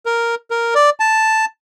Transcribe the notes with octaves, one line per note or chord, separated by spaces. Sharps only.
A#4
A#4
D5
A5